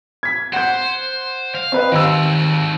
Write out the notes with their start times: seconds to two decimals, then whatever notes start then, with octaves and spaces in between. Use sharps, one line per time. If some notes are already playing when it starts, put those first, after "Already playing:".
0.23 G#6 B6
0.53 C5 F#5 G6
1.55 F5
1.72 C4 B4 D#5
1.92 D#2 D#3 C4 E6